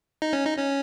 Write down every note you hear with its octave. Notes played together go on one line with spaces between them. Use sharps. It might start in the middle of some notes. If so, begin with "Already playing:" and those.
D#4
C#4
D#4
C#4